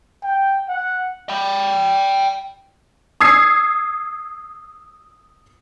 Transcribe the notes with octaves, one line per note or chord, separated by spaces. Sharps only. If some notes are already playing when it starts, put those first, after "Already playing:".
G5
F#5
G5 B5
D#6 E6 G#6 C7